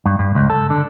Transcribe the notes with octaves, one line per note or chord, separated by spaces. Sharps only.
G2
G2
C#2
A4
D3